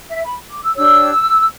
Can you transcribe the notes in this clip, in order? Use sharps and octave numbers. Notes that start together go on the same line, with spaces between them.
E5
B5
D6
E6
D4 G4 C#5 E6